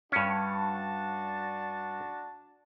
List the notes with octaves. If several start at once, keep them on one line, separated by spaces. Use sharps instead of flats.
G2 C#4 D4 F#4 A5